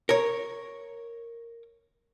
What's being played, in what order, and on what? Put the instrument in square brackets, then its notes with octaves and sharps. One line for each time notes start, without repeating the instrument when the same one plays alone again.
[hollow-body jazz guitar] A#4 C#5